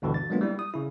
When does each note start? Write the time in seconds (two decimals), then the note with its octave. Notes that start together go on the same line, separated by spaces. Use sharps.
0.02 D2 G2 B2 D3 E3
0.14 A6
0.30 F#3 G#3 A#3 B3 D4 F4
0.41 G3 E4
0.59 D#6
0.74 C#3 E4